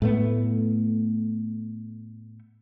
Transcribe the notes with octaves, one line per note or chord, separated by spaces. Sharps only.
A2 A3 B3